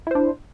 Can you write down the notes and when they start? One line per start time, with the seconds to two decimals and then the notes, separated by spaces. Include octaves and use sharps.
0.07 E4
0.11 C5
0.15 D4